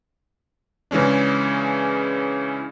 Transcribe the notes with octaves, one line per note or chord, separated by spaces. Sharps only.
C#3 E3 G#3 C#4 D4